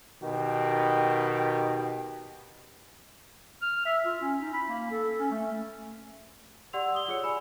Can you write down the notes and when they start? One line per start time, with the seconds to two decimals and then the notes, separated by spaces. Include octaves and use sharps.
0.22 B2 D#3 G4
3.62 F6
3.86 E5
4.05 F4
4.21 C#4
4.41 D#4
4.53 B5
4.69 A#3
4.91 A4
5.19 C#4
5.31 A3
6.73 G4 D5 F#5 C6 E6 F7
6.92 D5 D#6 G7
7.08 F4 G#4 C#5 E6 C#7
7.23 D5 G#5 B5